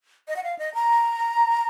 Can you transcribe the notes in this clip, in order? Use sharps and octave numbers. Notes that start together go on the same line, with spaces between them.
D#5
F#5
F5
D#5
A#5